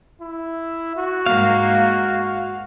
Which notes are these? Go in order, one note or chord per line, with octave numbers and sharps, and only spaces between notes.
E4
F#4
G#2 A#3 F5